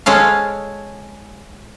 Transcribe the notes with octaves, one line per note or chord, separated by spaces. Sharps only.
G#3 C#4 A4 F5